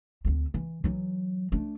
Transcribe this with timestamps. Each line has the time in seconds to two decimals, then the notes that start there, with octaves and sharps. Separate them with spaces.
0.25 D2 C4
0.54 E3
0.84 E3 F#3
1.52 A3 D4